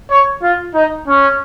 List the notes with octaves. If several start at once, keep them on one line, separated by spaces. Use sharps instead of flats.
C#5
F4
D#4
C#4